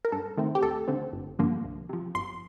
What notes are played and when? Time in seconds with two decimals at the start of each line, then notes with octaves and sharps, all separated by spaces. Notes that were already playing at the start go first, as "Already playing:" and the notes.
0.05 A#4
0.12 G2 A4
0.37 D#3 A3 C4
0.55 G4
0.63 D2 A4
0.88 D3 A3 C4
1.13 G1
1.39 G2 D3 F3 A#3
1.64 C2
1.89 C3 F3
2.15 G1 C6